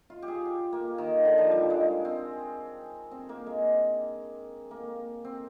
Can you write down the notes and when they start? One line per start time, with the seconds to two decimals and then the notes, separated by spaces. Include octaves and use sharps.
0.10 F4
0.22 G4
0.28 G#4
0.45 G4
0.73 A#3
0.98 D#3
1.25 D3
1.38 F3
1.51 G3
1.70 G#3
2.05 C4
3.11 C4
3.29 A#3
3.47 G#3
4.71 A#3
5.25 C4